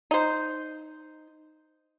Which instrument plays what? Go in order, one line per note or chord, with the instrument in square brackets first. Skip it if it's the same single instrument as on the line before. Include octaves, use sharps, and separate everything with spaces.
[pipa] D#4 C5